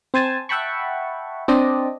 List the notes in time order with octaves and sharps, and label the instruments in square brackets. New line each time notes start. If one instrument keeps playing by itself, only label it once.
[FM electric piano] C4 C5 G#5 A5
E5 F#5 G5 A5 B5 C#6
C4 D4 D5 D#5